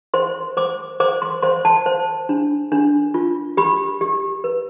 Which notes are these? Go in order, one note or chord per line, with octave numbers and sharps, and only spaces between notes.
C5 C6
C5 D6
C5 D6
C6
C5 C6
A5
C5
D4
D4
F4
G4 B5
G4
B4